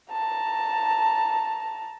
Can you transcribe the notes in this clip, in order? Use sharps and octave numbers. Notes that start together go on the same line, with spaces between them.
A5 A#5